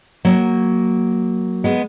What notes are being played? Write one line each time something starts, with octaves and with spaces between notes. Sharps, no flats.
F#3 A#3
G#3 B3